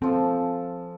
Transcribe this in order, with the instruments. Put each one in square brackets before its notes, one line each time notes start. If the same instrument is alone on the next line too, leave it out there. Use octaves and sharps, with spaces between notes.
[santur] F3 A4 [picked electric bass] C4